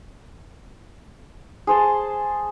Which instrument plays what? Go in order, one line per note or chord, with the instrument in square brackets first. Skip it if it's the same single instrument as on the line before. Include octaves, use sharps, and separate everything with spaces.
[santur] G#4 C5 A5